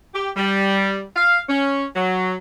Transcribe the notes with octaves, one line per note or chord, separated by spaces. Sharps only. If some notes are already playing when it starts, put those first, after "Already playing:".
G4
G3
F5
C#4
F#3